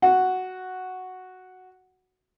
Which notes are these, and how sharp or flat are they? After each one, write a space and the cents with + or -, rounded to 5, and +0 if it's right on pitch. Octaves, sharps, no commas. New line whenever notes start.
F#4 +0 F#5 +0